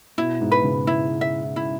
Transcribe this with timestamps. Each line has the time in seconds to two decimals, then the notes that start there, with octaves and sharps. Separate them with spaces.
0.18 B2 E4
0.41 G#2
0.52 B4
0.64 G#2 C#3
0.87 E4
1.21 E5
1.56 E4